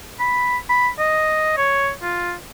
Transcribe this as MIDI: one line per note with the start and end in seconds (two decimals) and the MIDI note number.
0.20 0.57 83
0.70 0.89 83
0.99 1.55 75
1.57 1.90 73
2.02 2.34 65